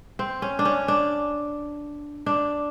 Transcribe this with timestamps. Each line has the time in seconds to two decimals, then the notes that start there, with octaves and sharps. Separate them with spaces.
0.19 C4
0.42 C#4
0.59 D4
0.65 C#4
0.88 D4
2.26 D4